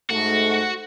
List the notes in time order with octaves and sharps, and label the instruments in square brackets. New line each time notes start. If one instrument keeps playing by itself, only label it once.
[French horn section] G#2 A3 [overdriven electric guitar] F#4